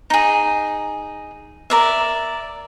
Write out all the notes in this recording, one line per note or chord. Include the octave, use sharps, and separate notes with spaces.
D#4 G#4
A#4 D5 E5